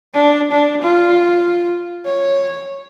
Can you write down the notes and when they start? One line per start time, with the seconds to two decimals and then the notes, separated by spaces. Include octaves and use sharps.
0.14 D4
0.51 D4
0.82 F4
2.05 C#5